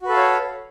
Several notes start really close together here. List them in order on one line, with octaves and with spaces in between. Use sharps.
F#4 B4 A4 F5 C#5